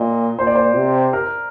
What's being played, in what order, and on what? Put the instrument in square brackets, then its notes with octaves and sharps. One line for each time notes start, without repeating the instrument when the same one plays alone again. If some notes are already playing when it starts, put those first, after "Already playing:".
Already playing: [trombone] A#2 [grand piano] D#5
[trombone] A#2 [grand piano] C5
[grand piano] D5
C5
[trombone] C3
[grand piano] A#4